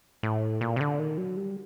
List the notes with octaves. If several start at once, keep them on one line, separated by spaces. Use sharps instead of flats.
A2
A#2
C3
D3
D#3
F#3
G3